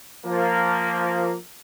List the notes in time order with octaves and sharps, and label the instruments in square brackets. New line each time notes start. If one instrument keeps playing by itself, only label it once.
[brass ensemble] F3 A#3